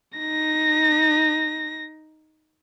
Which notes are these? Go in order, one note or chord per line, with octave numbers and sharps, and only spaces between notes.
D#4 A#6